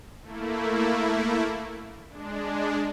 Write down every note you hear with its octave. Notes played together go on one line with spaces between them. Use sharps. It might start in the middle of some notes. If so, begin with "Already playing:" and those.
A3 A#3 E4
G#3 D4